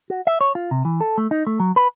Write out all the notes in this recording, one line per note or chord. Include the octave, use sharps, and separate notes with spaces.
F#4
E5
C#5
F4
C3
E3
A4
A3
D#4
A3
F#3
B4